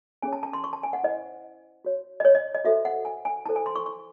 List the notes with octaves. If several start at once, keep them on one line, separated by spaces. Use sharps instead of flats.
C#4 G#4 C#5 G#5
A5
A5
C6
C#6
A5
G#5
F#5
E4 C5 D#5
F#4 C#5
D#5
C#5
D#5
D#5
F#4 A4 C5 E5
F#5
G#5
G#5
E4 A4 C5 A5
G#5
C6
C#6
C#6